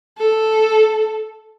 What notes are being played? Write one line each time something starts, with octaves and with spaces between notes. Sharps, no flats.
A4